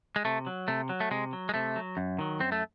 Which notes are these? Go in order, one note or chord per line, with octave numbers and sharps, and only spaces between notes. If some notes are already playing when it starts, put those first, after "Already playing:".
G#3
C3 A3
F#3
C3 A3
F#3
A3
C3 G#3
F#3
G#3
C3 A3
F#3
F#2
D#3 F#3
F#2 C4
A3